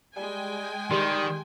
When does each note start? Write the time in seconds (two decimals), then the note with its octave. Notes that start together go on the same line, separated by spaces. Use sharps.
0.16 G3 G#3 G5 G#5
0.91 D#3 G3 G4 C6